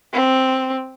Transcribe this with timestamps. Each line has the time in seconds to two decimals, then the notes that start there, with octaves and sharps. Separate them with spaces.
0.14 C4